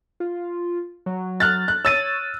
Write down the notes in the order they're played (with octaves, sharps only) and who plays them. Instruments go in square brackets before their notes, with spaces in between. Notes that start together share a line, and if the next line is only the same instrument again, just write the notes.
[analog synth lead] F4
F#3
[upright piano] F6 F#6 A6
F#6
[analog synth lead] C#5 [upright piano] E6 A6 D#7